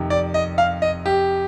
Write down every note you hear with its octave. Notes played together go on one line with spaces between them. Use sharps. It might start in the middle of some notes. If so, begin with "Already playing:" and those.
Already playing: F2 C3 D#3
D5
D#5
F5
D#5
G4